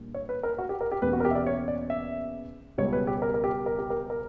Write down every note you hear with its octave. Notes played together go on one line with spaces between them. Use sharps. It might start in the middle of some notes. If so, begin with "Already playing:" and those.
Already playing: A#2 G3 A#3 D4
C#5
B4
A#4
F#4
G4
A#4
G4
E2 B2 A#3 C#4 B4
F#4
A#4
G4
E5
D5
C#5
D5
E5
C#2 B2 G3 B3 C#5
B4
G4
A#4
A#4
G4
A#4
G4
A#4
A#4